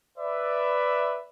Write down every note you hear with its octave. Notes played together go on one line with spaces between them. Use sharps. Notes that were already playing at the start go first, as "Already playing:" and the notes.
B4 D5 E5